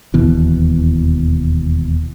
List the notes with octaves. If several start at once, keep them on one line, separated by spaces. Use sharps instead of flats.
E1 D#2 B2 E3